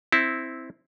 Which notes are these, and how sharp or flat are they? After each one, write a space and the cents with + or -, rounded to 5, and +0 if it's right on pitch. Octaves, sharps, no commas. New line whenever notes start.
C4 +0 E4 -10